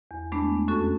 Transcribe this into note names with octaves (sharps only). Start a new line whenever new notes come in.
E2
G#3 A3 B3 D4
F2 C#4 F#4 A4